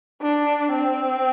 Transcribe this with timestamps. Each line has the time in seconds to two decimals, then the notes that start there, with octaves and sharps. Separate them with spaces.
0.22 D4
0.73 C4